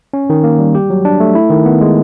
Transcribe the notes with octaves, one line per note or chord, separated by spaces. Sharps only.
C#4
D#3
A#3
G3
G4
F#3
D4
A3
E4
D#3
B3
G#3